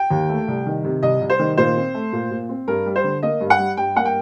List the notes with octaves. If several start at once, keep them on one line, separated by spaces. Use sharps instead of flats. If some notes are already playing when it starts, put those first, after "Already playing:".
Already playing: G5
D#2
A3
C2
D#3
C3
C2 D#5
C2
C5
D#3
A#2 C5
C4
A3
A#2
A#2
C4
G2 A#4
G3
C5
D3
A#3 D#5
G2
F#5
G3
G2 G5
A#3 F#5
G5